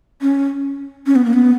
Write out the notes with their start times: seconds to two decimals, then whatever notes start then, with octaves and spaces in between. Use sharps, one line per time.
0.22 C#4
1.06 C#4
1.16 B3
1.25 A#3
1.33 B3